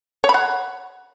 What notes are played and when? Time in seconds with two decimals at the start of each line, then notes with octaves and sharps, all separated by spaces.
0.24 C#5
0.29 B5
0.34 F#5